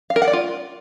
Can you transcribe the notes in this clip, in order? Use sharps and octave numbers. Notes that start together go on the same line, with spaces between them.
F5
A#4
F#5
D5
F4